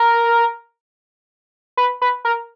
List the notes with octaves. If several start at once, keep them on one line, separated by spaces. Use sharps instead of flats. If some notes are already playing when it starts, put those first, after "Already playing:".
Already playing: A#4
B4
B4
A#4